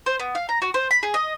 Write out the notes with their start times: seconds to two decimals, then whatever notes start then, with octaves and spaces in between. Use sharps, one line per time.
0.06 C5
0.20 B3
0.35 F5
0.49 A#5
0.62 F#4
0.74 C5
0.91 B5
1.03 G#4
1.14 D#5